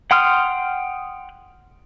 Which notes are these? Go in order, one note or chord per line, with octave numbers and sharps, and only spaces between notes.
F#5 G5 C6 D#6 F6